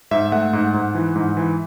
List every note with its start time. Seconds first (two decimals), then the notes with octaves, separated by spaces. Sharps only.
0.11 G#2 E5
0.32 A3 F#5
0.53 G#2
0.74 G#2
0.95 E3
1.15 G#2
1.37 E3